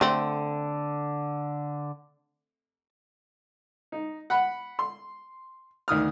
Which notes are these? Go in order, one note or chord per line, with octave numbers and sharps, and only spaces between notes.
D3 A3 C4
D#4
F#5 B5
C6
D2 D#3 D#6 F6